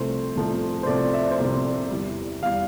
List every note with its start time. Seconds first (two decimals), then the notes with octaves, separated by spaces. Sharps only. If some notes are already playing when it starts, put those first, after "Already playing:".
Already playing: C2 C3 F3 A3 C5
0.35 C2 C3 F3 A3
0.83 C5
0.87 C2 C3 F3 A3 D5
1.13 E5
1.23 D5
1.31 C5
1.39 C2 C3 F3 A3 D5
1.91 E2 E3 G3
2.42 E2 E3 G3 F5